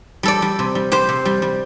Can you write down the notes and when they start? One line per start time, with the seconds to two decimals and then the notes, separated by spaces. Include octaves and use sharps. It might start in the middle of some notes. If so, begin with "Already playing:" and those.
0.23 G3 A4 D5
0.42 G3
0.59 C3
0.75 G3
0.92 G3 G4 C5
1.09 C3
1.25 G3
1.42 G3